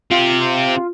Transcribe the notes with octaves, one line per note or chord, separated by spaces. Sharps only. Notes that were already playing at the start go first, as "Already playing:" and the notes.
C4 F4 G4